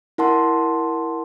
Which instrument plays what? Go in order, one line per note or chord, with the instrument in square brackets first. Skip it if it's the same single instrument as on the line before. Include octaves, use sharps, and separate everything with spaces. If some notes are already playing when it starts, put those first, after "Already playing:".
[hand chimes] E4 A#4 F#5 A5 C6